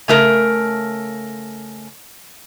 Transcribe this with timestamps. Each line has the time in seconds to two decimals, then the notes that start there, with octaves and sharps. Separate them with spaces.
0.08 C#3 A3 A#4